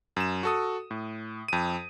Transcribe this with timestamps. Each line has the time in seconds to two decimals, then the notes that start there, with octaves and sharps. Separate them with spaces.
0.16 F#2 E7
0.43 F#4 A4 D#6
0.91 A2
1.48 F2 D#7